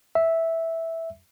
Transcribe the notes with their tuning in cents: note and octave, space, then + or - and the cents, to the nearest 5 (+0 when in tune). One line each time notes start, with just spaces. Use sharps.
E5 -5